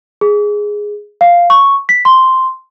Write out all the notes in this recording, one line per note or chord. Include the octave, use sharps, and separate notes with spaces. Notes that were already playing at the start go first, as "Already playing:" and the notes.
G#4
F5
C#6
B6
C6